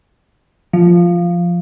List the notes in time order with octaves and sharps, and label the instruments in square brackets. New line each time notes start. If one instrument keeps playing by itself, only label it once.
[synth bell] F3